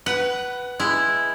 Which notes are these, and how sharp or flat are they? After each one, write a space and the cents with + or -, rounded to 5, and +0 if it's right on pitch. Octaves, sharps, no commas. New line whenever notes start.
B4 +0 F#5 +25
G#3 +0 E4 +5